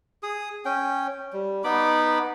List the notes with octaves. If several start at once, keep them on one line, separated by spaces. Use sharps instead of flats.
G#4 D#6
C#4 G5
G3
B3 D#4 B5 D6